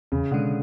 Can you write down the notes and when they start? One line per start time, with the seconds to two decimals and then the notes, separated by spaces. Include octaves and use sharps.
0.12 E2 C#3
0.31 B2 D3 G#3